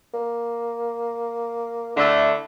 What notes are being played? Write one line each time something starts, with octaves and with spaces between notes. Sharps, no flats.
A#3
D3 A3 E4